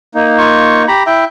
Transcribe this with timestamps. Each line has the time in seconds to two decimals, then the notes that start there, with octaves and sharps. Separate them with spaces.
0.15 A#3 D#4
0.38 F4 C#6
0.88 G4 A#5 B5
1.06 E4 E5 G5